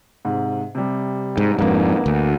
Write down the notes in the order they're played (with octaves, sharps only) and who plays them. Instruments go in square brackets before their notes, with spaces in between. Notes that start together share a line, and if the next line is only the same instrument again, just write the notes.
[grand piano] G#2 C3
C3 G3
[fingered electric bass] G#2
[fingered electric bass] F2 G#2 [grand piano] D3 A#3 B3
[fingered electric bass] D2